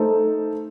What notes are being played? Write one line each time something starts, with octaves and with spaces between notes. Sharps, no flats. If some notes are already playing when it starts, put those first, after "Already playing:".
Already playing: A3 D#4 A4 C5